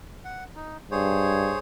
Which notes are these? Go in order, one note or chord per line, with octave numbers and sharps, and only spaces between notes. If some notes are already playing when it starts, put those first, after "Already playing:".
F#5
D#4
G2 G#4 C5 C#5